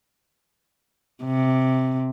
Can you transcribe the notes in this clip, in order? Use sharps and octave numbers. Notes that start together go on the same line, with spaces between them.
C3